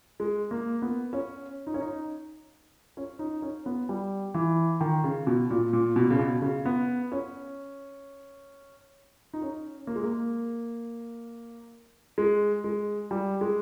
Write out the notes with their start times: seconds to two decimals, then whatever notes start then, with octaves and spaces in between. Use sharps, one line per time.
0.20 G#3
0.51 A#3
0.82 B3
1.13 C#4
1.67 D#4
1.74 C#4
1.81 D#4
2.97 C#4
3.19 D#4
3.42 C#4
3.66 B3
3.89 G3
4.34 E3
4.81 D#3
5.04 C#3
5.27 B2
5.50 A#2
5.73 A#2
5.96 B2
6.10 C#3
6.19 B2
6.42 C#3
6.65 B3
7.12 C#4
9.33 D#4
9.42 C#4
9.87 A#3
9.96 G#3
10.04 A#3
12.18 G#3
12.64 G#3
13.11 G3
13.41 G#3